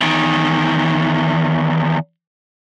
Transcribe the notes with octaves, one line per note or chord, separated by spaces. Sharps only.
E2 D#3